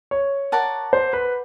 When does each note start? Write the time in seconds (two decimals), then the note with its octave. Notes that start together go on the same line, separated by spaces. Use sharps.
0.11 C#5
0.52 A#4 D5 F#5 A5
0.93 C5
1.13 B4